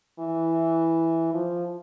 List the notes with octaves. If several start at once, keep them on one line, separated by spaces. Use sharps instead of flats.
E3
F3